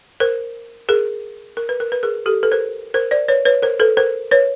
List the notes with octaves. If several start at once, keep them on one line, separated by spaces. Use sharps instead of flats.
A#4 C5
G#4 A#4
A#4
B4
A#4
B4
G#4 A#4
G4 A4
A4 B4
A#4 C5
A#4 C5
C5 D5
B4 C#5
B4 C#5
A#4 C5
A4 B4
A#4 C5
B4 C#5